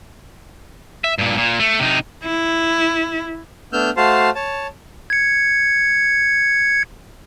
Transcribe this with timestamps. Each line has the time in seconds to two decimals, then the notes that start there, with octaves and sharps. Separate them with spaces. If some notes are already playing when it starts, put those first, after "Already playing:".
1.04 E5
1.18 G2 A#2
1.37 A#2
1.59 A3
1.79 C3 D#4
2.24 E4
3.73 A3 B3 D4 E6 F6 G6
3.97 A3 F#4 C5 F5 A5 C6
4.35 C#5 A5
5.10 G#6 C#7